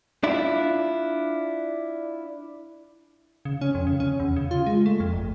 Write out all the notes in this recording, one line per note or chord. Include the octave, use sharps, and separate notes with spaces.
D4 E4 F4
C#3
C#4
F2
C#3
C#4
E2
C#3
F4
G#3
A3
F2
G1